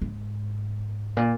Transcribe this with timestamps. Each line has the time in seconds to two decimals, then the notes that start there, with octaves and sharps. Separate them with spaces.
0.02 G#2
1.17 A#2